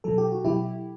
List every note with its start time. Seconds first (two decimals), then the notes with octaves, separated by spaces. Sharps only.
0.04 B2 F#3 A4
0.18 G4
0.32 F#4
0.44 B2 F#3 E4 G4